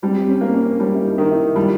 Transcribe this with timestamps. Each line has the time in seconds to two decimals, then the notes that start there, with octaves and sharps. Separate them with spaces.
0.02 G3 C4
0.19 C4
0.28 C#4
0.41 A#3
0.54 C#4
0.79 G3 C#4
0.95 E4
1.05 D#4
1.18 D#3
1.31 E4
1.56 G3 F4